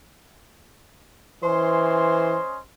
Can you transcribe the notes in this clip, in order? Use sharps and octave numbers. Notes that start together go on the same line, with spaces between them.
E3 C#4 C5 D#5 C6